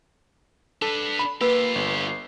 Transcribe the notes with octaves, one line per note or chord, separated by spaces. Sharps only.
D4 A4 B4
B5
A#3 F4 G4 B4 B5 E6
G1